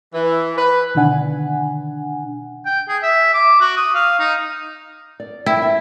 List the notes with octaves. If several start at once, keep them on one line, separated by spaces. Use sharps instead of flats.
E3
B4
B2 D3 D#3 D4 F#5 G#5
G5
G#4
E5
D6
F#4
D#6
F5
D#4
D5
E4 G5
E5